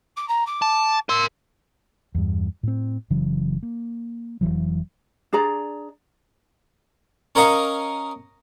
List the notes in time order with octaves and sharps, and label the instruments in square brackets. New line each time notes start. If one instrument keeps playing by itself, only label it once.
[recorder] D6
A#5
D6
[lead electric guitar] A5
[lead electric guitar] A#4 C6 [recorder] E6
[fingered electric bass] E2 G2
A2 C4
F#1 C#3 E3 F#3
A#3
F1 E2 E3 F#3
[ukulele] D4 G#4 D5 A#5
[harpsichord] C#4 A#4 C#5 D#5 F5 C#6